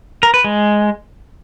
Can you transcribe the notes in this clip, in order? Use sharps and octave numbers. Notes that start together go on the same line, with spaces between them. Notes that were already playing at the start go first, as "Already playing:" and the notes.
A#4
B4
G#3